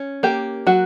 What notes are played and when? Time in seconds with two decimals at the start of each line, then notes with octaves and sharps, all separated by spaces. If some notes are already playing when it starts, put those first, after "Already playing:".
Already playing: C#4
0.23 A#3 G4
0.67 F#3 F#4